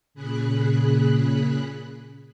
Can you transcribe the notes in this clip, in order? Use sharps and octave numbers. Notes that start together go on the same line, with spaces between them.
A#2 C#3 G#4 B5 F#6